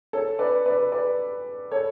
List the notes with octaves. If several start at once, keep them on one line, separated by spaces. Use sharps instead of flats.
A4 C#5
B4 D5
B4 D5
B4 D5
A4 C#5